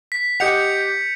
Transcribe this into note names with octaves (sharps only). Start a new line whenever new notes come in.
B6
G4 D#5 F#5 G6 C#7 F7